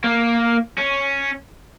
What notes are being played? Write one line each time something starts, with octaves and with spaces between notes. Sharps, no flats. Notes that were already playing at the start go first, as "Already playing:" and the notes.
A#3
C#4